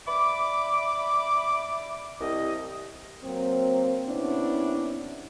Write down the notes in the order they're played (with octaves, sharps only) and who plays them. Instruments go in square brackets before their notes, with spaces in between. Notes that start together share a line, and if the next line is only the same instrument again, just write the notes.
[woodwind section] D5 E5 B5 D6
C2 D#5
[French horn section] F#3 A#3 C4
C3 B3 C#4 D4 E4